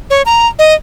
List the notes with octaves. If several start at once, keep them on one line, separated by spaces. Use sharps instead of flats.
C#5
A#5
D#5